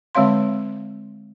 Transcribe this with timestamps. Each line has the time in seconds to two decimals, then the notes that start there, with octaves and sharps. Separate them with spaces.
0.15 D3 G#3 C4 C#5 F5 C6